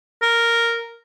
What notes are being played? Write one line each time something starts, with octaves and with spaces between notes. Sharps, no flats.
A#4